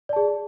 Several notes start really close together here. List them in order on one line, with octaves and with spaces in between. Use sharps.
D5 A5 G#4